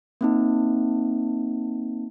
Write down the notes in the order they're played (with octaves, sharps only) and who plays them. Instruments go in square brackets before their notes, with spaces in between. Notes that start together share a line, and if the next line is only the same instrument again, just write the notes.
[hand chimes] A#3 C4 D#4